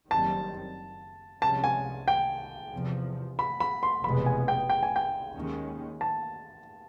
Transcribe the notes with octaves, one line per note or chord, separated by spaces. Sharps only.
F#1 F#2 D#3 G3 C4 A5
C2 C3 F3 G#3 C#4 A5
G#5
G5
E2 C3 F3
B5
B5
C6
F1 E2 B2 G#3 B3 B5
G#5
G5
G5
G#5
G5
D#2 D#3 G#3 C#4
A5